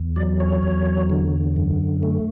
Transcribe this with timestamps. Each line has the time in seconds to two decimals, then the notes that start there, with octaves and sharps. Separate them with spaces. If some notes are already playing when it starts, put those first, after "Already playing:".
Already playing: E2
0.16 F#3 D5
0.40 C#5
0.63 E2
1.10 D3
1.56 F#2
2.03 A3